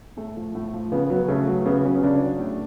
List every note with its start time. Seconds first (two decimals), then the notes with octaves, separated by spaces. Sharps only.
0.17 A2 A3
0.37 F3
0.55 A2
0.74 F3
0.92 C#3 B3
1.10 F#3 B3
1.28 C#3 A3
1.47 F#3
1.66 C#3 B3
1.85 F#3 C#4
2.03 C#3 D4
2.22 F#3
2.39 A2